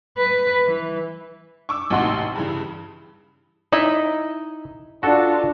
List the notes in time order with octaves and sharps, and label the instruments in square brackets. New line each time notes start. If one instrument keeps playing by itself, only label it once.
[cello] B4
E3
[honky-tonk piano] C#6 D6 E6
A1 D#2 C3 F#4 D#5 C6
G2 C#3 E3
[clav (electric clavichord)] D#4 [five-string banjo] E4 D#5 E5
[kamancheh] D4 F4 [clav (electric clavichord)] F#4 A4